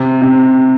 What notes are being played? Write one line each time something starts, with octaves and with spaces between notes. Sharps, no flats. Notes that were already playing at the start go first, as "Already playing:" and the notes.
Already playing: C3
C3